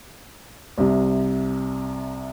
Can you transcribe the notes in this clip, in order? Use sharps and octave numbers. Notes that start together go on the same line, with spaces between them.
C2 C3